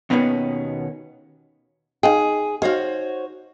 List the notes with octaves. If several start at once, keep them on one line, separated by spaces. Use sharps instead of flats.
D#2 B2 D#3 B3 C#4
D#4 G#4 F5 G5
D#3 F#4 C5 C#5 F5